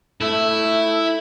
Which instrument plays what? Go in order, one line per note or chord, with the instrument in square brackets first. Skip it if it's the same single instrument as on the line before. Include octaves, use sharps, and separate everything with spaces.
[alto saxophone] A3 [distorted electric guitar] E4 [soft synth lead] E5